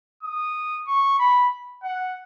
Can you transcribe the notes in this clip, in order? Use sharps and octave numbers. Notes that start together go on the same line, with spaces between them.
D#6
C#6
B5
F#5